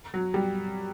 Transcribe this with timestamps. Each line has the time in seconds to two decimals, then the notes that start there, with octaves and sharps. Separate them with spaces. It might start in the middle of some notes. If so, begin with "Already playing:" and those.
0.14 F#3
0.34 G3